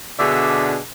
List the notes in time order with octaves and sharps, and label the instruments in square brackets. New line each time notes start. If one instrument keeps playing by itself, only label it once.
[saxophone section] B2 D3 D4 G#4 E5